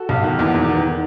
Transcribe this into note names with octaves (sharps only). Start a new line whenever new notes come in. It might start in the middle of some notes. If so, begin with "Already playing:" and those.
Already playing: F#4 A4
B1
D#3
E2
E2
D#3